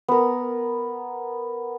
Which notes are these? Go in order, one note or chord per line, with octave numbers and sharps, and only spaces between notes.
B3 A#4